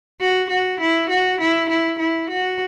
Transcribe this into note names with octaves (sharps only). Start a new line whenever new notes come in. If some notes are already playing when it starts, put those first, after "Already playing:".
F#4
F#4
E4
F#4
E4
E4
E4
F#4